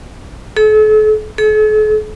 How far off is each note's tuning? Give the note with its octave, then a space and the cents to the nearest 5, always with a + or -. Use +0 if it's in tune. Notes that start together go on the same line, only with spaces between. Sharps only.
A4 -40
A4 -45